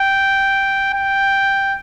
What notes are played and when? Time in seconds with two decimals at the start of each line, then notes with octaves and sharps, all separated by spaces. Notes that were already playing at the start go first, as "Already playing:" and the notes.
Already playing: G5
0.93 G5